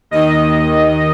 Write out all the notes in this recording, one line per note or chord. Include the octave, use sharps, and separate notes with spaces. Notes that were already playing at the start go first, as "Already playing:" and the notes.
D#2 D#3 D#5